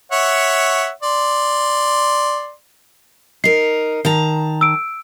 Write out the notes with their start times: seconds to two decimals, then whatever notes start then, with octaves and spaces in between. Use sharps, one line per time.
0.12 C#5 E5 F#5
1.03 D5 C6
3.44 D#4 A#4 C7
4.05 D#3 A5 A#5
4.61 E6 D7